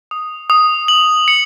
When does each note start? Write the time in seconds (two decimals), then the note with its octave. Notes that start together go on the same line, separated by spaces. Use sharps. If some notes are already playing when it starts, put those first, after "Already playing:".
0.11 D#6
0.50 D#6
0.88 F#7
1.28 C#7